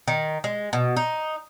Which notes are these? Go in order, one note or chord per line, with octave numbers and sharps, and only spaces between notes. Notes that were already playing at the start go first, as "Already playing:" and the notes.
D#3
G#3
B2
D#4